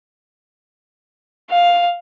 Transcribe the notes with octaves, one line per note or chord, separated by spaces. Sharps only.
F5